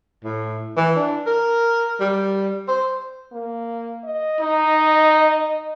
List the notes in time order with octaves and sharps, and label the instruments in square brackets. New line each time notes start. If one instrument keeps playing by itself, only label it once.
[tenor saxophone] A2
E3
D4
A#4
G3
C5
[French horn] A#3
D#5
[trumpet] D#4